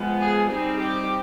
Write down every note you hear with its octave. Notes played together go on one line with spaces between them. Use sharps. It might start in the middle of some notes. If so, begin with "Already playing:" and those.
Already playing: F3 G#3 B3
G#4
G3 C4 D#4 G#4
G4